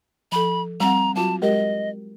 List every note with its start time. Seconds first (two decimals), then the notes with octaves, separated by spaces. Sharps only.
0.32 F3 A4 B5
0.80 G3 C4 F#5 A#5
1.16 F#3 F4 F#4 A5
1.42 G#3 G4 A#4 D#5